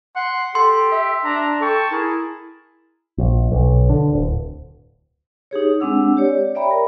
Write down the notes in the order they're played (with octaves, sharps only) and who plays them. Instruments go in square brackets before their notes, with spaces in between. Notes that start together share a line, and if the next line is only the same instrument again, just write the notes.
[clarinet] F#5 [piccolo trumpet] C6
[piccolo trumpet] G4 [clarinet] A4 [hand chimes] C6
[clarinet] E5
[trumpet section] D4 [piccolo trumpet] A#5
[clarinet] A4 [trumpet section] G5 C#6 [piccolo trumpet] A5
[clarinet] E4 [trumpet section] G#4 A#4
[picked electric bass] A#1
B1
D3
D1
[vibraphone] D#4 G4 G#4 C#5
G#3 C4 D4 F#5 E6
G4 C#5 D5
C#5 D5 E5 G5 A#5 B5
A#4